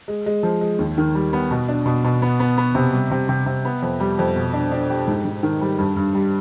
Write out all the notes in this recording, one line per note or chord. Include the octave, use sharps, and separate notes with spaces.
G#3
G#3
F3
G#3
D#2
D#3
G3
B3
B2
D4
B2
B2
B3
B3
B3
C3
G3
C3
C3
C3
B3
F2
G3
F2
B2
D4
D4
G4
G#2
G#2
D#3
G3
G2
G2
G3